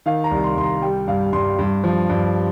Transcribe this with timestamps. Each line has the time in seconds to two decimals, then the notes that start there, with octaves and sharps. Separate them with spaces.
0.06 D#3 F5
0.24 A#5
0.31 C2
0.44 C6
0.56 C2 C6
0.63 A#5
0.82 G3 G5
1.08 G2 F5
1.33 G2 C6
1.59 G2
1.84 F3
2.10 G2